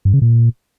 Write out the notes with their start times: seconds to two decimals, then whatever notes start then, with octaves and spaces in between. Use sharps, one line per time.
0.05 G2
0.13 C#3
0.22 A#2